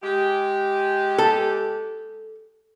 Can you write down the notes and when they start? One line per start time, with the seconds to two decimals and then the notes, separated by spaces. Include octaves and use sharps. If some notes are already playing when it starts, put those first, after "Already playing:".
0.03 G#3 G4
1.18 A4